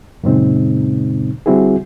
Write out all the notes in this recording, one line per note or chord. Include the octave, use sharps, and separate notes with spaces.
F#2 A#2 C#3 G#3 C4 D#4
D3 G3 C4 E4 F#4 G#4